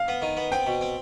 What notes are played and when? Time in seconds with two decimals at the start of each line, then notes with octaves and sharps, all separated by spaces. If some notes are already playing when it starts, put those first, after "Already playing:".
Already playing: F5
0.08 B3
0.22 D#3
0.37 B3
0.52 C4 G5
0.67 B2
0.81 C4